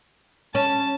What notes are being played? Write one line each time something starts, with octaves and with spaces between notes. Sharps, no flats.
C#4 A5